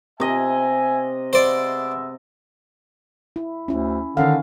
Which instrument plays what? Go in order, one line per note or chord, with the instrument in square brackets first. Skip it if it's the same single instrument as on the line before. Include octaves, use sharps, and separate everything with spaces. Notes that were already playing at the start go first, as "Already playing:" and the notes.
[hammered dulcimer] C3 D#5 [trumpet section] E5 G#5
[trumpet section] G#3 B3 E5 [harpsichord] C5 D5
[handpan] E4
[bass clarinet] D2 [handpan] C#4 E4
[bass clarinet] D3 [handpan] D#3 C#4 F5